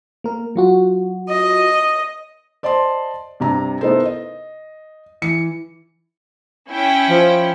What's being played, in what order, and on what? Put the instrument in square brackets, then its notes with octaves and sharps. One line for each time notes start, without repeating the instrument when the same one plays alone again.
[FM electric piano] A#3 A#4
F#3 F4 F#4
[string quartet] D#5
[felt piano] C5 D5 D#5 A5 C6
G2 C3 A#5
B3 D#4 E4 A4 A#4 C5
D#5
E3 C#7
[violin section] C#4 E4 G5
[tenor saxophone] F3